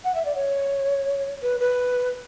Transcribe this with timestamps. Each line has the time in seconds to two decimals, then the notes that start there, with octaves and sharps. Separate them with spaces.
0.04 F#5
0.15 E5
0.25 D5
0.35 C#5
1.42 B4
1.60 B4